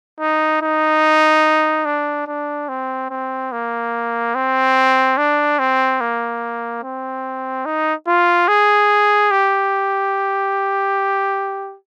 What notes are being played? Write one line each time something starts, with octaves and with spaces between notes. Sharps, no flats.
D#4
D#4
D4
D4
C4
C4
A#3
C4
D4
C4
A#3
C4
D#4
F4
G#4
G4